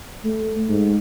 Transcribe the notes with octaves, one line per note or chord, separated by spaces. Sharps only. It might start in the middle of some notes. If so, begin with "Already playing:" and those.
A3
G#2